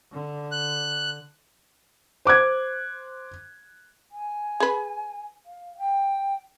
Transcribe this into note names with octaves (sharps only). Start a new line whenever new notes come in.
D3
F#6
C5 D6 F#6 G#6
G#5
G#4 B4
F5
G5